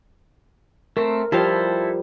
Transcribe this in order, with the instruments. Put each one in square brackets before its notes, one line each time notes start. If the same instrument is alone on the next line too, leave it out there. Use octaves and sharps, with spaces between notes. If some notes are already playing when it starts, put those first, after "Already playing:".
[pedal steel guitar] A3 C4 [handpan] A#4
[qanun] F3 G3 F5 [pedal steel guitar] E4 A4 C5 [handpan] G4